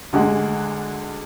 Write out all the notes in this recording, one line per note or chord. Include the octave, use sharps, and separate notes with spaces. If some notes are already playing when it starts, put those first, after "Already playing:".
D2 D3 G#3 F#5